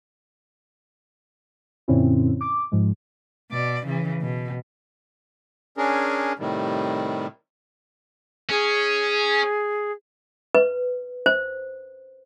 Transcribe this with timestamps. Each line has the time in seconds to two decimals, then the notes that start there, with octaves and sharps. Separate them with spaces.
1.88 F#2 A#2 D3 C4 C#4 E4
2.41 D6
2.72 G#2 F3 G#3
3.51 B2 D5
3.87 C#3 E3
4.22 B2
5.77 C#4 D4 G#4 A#4
6.39 A2 C3 D#3 G3
8.50 C#4 G#4
10.55 B4
11.26 C5